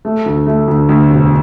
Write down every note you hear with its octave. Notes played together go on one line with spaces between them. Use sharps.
A3
D2
A3
D2
D2
E1